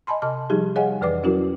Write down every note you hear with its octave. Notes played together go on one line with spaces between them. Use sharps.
D#5 G#5 A5 B5 C6
C3 D#5 A5 F6
F3 G3 D#4 G4 G#4
G#4 C#5 D#5 F5 F#5 G#5
F2 D#3 E3 B4 D5 D6
F#3 C#4 E4 F#4 A#4